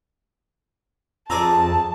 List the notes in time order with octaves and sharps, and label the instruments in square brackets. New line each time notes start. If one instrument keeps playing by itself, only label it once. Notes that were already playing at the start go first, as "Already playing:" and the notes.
[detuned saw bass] F2 [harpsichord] F4 G#4 D5 [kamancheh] A5 [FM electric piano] A#5 E6